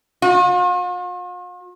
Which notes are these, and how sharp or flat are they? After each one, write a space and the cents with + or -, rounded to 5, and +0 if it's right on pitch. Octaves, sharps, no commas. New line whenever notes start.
F4 +45